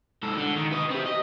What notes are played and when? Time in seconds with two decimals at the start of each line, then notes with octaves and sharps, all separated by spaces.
0.23 G#2 A4
0.37 D3
0.57 D#3
0.72 B4 D#5
0.90 C4 G4
1.05 D#5